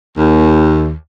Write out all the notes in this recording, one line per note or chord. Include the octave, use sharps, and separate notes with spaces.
D#2